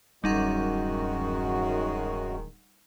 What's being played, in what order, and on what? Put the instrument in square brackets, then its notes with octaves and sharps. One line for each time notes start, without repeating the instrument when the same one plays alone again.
[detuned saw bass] D1 [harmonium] F#2 F#4 [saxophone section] D#3 G#3 [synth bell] G3 D#4 F#5